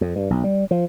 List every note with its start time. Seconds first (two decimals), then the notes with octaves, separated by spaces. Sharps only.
0.01 F2
0.16 G2
0.30 B1
0.44 G3
0.71 F3